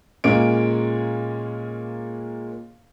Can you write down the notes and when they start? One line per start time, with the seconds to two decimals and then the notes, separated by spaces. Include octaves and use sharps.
0.24 A#2 G#3 A#3 C#4 D7